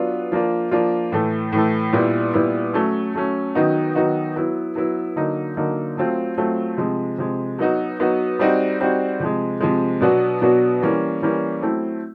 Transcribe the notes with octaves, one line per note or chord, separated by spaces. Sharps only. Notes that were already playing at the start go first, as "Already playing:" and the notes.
Already playing: F#3 B3 D4 F4
F3 A#3 D4 F4
F3 A#3 D4 F4
A2 E3 A3
A2 E3 A3
A#2 G3 B3 E4
A#2 G3 B3 E4
F#3 A3 C#4
F#3 A3 C#4
D#3 F#3 B3 D#4 F#4
D#3 F#3 B3 D#4 F#4
F#3 B3 E4
F#3 B3 E4
D3 F#3 A#3 D#4
D3 F#3 A#3 D#4
F#3 A3 C4 F4
F#3 A3 C4 F4
C3 F3 G#3
C3 F3 G#3
F#3 B3 D#4 F#4
F#3 B3 D#4 F#4
G3 C4 D#4 F#4
G3 C4 D#4 F#4
C3 F3 G#3
C3 F3 G#3
B2 F#3 B3 D4 F#4
B2 F#3 B3 D4 F#4
E3 G3 A#3 C#4
E3 G3 A#3 C#4
F#3 A3 C4 E4